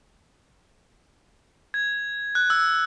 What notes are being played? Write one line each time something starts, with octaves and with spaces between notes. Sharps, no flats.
G#6
F#6
E6